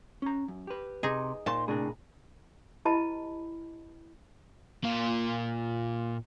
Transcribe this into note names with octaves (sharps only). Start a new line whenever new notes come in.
C#4 A#5
F#2
G4 B4
C3 D#4 G#4
A#2 D#4 C5 A5
A2 C3 D4 G#4 A#4
E4 G4 B4 D#5 A5 B5
A#2 F4